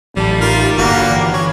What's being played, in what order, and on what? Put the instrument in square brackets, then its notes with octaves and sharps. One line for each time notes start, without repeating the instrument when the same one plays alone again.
[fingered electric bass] A1 [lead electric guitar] F#3 A5 [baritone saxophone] G3
[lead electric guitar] D#4 [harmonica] F4 A#4
[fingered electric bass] G1 [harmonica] A#3 F#4 [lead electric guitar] F4
[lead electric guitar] E3 [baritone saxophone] D4
[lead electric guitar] E3 [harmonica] C#5